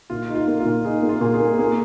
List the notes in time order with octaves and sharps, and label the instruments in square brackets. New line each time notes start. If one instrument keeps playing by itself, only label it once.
[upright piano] A#2 [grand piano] F4
[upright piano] D#4
[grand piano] F4
[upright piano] A#3
[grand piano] F4
[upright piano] A#2
[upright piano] D#4 [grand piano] G#4
[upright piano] A#3
[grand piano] F4
[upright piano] A#2
[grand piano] G#4
[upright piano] A#3
[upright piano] A#3 [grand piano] G#4